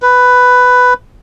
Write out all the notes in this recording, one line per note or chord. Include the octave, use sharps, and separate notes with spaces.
B4